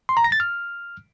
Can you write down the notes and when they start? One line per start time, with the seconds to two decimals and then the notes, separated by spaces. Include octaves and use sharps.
0.09 C6
0.17 A#5
0.24 A#6
0.32 A6
0.40 F6